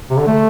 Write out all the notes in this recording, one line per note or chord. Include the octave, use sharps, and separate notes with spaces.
C3
D3
A3